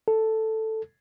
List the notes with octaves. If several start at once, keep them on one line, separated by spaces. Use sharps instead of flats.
A4